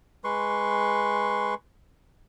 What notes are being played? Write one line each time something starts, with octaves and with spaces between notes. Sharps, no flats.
G#3 B4 C6 C#6